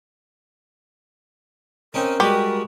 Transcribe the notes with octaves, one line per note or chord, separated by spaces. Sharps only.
C4 C#4 D#4 A#4
G3 G#3 F#4 G4 B4 D5